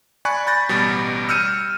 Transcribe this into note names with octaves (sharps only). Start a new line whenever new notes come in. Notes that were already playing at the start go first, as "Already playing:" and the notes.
D5 G#5 B5 C#6 F#6
B5 G6 A6 A#6
A1 B2 G3 B5
E6 F6 G6 C#7 D#7